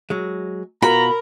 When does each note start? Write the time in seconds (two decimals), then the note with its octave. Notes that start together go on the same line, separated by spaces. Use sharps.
0.10 F#3 G#3
0.82 B2 F4 F#4 A#4 A#5 B5